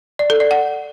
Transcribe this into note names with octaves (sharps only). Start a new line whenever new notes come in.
D5
A4
D5
F#5